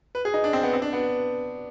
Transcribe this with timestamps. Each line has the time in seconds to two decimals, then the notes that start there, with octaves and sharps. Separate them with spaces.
0.15 B4
0.25 G#4
0.34 D#4
0.44 D4
0.53 C4
0.63 B3
0.73 C4
0.82 D4
0.93 B3